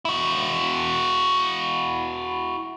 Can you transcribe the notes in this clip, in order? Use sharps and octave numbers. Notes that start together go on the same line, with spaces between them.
E4 F#4